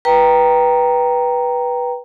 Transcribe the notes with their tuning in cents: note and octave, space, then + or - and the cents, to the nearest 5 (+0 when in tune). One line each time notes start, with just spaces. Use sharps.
B4 -15 G5 +0 A#5 +0